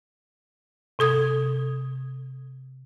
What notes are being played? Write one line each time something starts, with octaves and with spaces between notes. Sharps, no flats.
C3 A4 D#6 G#6